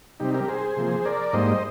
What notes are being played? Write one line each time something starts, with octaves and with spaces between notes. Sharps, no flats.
C3 G3 C4 D#4 G4
G4 A#4
G#4 C5
C3 F3 A#3
A#4 D5
G#2 G3 A#3 C5 D#5